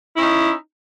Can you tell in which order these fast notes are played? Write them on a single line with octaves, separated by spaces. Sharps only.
E4 C#4 D#4